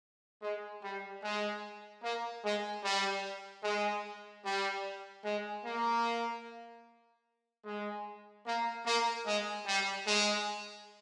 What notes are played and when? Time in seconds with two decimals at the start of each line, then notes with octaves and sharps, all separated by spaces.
0.42 G#3
0.83 G3
1.23 G#3
2.03 A#3
2.44 G#3
2.83 G3
3.63 G#3
4.45 G3
5.24 G#3
5.65 A#3
7.65 G#3
8.46 A#3
8.86 A#3
9.26 G#3
9.67 G3
10.06 G#3